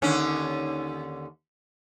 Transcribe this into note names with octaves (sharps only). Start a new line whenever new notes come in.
D#2 D3 C#4